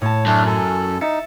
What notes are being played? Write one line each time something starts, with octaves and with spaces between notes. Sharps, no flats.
A2 C#5 A5
F#2 A3 D4
A4 G#5
D#4 E5 A6 C#7